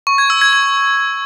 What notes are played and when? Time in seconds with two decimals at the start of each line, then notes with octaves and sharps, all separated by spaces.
0.07 C#6
0.18 G#6
0.30 E6
0.41 G#6
0.53 G#6